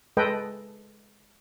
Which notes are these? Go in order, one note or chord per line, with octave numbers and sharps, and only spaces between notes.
G#3 A4 B4 D#5 G5